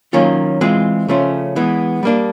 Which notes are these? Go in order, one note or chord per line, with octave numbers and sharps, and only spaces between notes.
D#3 F#3 A#3 C#4 F4
E3 G#3 C4 F4 G#4
C#3 F3 A3 C#4 F4
E3 G#3 B3
G3 A#3 D4